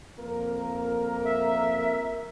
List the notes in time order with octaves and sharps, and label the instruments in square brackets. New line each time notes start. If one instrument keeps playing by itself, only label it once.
[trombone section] F2 A#3 A#4
[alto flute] E5